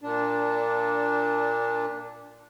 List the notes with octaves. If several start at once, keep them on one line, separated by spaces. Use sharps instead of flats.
A#2 D4